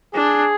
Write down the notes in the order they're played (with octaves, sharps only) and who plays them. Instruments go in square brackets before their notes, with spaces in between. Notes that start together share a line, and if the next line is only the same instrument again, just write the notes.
[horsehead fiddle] D4 [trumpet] G#4